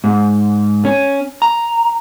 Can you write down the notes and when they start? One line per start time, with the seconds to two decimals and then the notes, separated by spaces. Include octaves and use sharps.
0.04 G#2
0.85 C#4
1.42 A#5